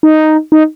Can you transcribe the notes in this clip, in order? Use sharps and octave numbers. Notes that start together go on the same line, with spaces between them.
D#4
D#4